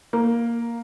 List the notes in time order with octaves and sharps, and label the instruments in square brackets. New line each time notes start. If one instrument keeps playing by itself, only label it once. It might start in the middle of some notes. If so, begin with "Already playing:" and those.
[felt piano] A#3